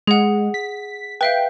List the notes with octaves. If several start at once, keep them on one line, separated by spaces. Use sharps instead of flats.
G#3 G#4 F#5
B6
B4 E5 F5 G5